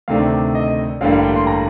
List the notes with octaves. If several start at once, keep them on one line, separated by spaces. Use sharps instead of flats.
D2 C3 D#3 A3 D4 F5
D#5
A1 G2 D3 G3 A#3 F5
F5
G5
C6
A#5